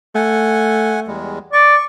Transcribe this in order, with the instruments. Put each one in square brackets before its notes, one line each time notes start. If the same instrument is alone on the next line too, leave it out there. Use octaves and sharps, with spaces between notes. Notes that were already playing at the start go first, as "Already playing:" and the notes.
[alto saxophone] A3 [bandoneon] F#5 G#5
[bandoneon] E2 G3 G#3
[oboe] D5 [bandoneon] C#6